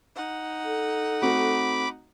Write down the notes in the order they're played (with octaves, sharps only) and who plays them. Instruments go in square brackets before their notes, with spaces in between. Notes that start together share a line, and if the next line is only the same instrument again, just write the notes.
[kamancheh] D#4 F#5
[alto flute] A4
[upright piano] A3 C4 F#4 [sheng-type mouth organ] B5 D6